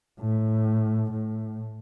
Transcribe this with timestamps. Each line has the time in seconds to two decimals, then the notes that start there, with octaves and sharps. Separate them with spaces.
0.20 A2
1.11 A2